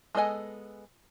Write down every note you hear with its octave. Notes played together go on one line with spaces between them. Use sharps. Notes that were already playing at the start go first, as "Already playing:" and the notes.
G#3 B3 A4 D#5 G#5